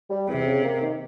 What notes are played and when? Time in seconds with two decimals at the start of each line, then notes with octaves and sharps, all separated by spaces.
0.10 G3
0.28 E2 C3
0.46 C#3
0.64 A#3
0.82 D#3